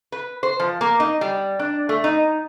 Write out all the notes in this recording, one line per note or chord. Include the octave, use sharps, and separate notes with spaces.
B4
C5
F3
A#3
D#4
G3
D4
A3
D#4